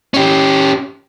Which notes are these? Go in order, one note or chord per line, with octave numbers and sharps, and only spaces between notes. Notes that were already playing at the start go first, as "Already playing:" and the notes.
C#4 G4